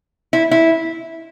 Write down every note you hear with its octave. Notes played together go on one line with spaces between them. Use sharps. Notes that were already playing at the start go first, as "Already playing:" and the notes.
E4
E4